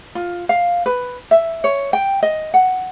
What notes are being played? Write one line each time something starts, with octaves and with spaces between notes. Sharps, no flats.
F4
F5
B4
E5
C#5
G5
D#5
F#5